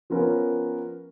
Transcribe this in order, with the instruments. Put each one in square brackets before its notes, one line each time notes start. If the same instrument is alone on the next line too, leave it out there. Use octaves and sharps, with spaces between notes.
[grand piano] F3 B3 C#4 A#4